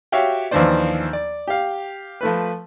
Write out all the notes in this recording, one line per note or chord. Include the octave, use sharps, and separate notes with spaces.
F#4 G4 C#5 E5 F5 G5
D#2 E3 F3 D4 C5 D5
D5
G4 F5
F3 A3 B4